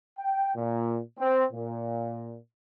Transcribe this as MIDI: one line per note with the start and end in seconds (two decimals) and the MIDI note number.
0.19 0.55 79
0.56 1.00 46
1.19 1.44 60
1.52 2.36 46